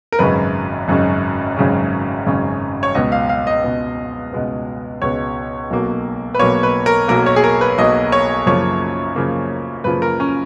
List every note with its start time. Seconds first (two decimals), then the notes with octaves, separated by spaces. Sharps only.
0.12 A#4
0.19 G#1 F#2 C#3 G#3 C#4 B4
0.88 G#1 F#2 C#3 G#3 C#4
1.56 G#1 F#2 C#3 G#3 C#4
2.26 G#1 F#2 C#3 G#3 C#4
2.83 C#5
2.95 C#2 B2 G#3 B3 D#5
3.12 F5
3.29 F5
3.47 D#5
3.64 C#2 B2 G#3 B3
4.33 C#2 B2 G#3 B3
5.01 C#2 B2 G#3 B3 C#5
5.71 B1 B2 F#3 A#3
6.34 B4
6.39 B1 B2 F#3 A#3 C#5
6.63 B4
6.86 A#4
7.08 B1 B2 F#3 A#3 A#4
7.26 C#5
7.36 G#4
7.44 A#4
7.61 B4
7.78 B1 B2 F#3 A#3 D#5
8.12 C#5
8.46 F#2 C#3 F3 A#3 C#5
9.16 F#2 C#3 F3 A#3
9.84 F#2 C#3 F3 A#3 B4
10.02 A#4
10.20 C#4